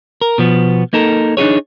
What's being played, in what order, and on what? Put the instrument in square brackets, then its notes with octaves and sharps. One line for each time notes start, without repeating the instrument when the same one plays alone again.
[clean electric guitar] A#4
B2 F3 B3
A#3 D#4 A4 A#4
D4 D#4 F4 G#4 C#5